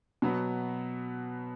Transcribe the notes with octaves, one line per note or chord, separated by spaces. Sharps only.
B2 F#3 B3